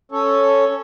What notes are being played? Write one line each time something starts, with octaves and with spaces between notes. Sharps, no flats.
C#4 A4 C#5